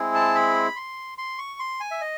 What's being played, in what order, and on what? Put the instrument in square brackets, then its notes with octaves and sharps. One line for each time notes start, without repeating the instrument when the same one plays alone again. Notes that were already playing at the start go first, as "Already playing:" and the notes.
Already playing: [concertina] G#3 C4 E4 G#4
A5
B5
C6
C6
C#6
C6
G#5
E5
D#5